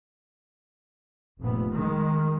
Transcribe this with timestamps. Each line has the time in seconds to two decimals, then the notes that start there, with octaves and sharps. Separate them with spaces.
1.40 F1 F2 A#2 B3
1.71 D#3 G#3